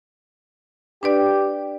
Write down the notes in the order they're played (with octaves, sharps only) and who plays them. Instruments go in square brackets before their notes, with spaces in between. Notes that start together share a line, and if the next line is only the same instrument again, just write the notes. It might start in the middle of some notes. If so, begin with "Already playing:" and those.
[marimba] D4 B4 D5 [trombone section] G4